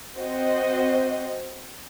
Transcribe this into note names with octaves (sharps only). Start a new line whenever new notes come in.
C4 F#4 C5 D#5